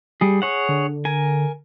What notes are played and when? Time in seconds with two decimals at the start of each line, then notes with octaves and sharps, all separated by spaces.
0.21 G3 G#4
0.42 G#4 C#5 F#5
0.69 D3
1.05 A#4 G#5